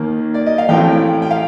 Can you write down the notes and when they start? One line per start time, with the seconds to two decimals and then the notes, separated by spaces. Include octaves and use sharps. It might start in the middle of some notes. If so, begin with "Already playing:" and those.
Already playing: D#2 D#3 A#3
0.34 D5
0.46 D#5
0.58 F5
0.69 A1 A2 F3 C4 G5
1.22 G5
1.31 F5